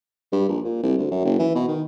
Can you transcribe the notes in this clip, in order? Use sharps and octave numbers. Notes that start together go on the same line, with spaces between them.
G2
A#1
A#2
C2
D2
F#2
F#1
E3
B2
D#3